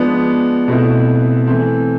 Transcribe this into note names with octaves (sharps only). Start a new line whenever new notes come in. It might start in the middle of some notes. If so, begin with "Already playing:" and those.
Already playing: F3 G#3 B3 D4
B2 A3 C4 E4
E3 A3 C4